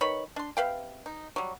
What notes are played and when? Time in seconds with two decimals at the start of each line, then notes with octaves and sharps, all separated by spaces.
0.01 D#3 B4 C#5 B5
0.36 D4 C6
0.57 C3 B4 F5 G5
1.06 D#4
1.36 F#3 G3